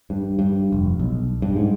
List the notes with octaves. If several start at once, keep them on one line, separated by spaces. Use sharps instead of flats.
G2
G2
F1
B1
G2
G#2